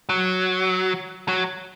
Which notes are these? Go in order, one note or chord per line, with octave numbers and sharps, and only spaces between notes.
F#3
F#3